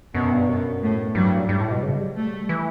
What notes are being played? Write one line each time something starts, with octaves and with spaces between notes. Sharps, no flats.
F#2 B2
G2
F#2 B2
A2
G2 F#3
G2 G3
A2
B2
C#3
G3
A3
E3